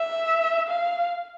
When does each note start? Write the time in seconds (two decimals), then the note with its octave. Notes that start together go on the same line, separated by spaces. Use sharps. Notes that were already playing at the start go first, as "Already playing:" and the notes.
Already playing: E5
0.69 F5